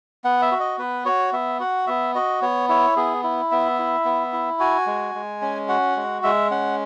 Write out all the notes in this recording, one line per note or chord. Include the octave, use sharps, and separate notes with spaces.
B3 F#5
E5
F#4
D#5
B3 B4
F#4 C#5
B3 E5
F#4 F#5
B3 E5
F#4 D#5
B3 C#5
E4 C#5
B3 G#4
E4
B3 E5
E4
B3
E4
F#4 G#5
G#3
G#3
C#4
F#4 F#5
G#3
G#3 E5
C#4 F#5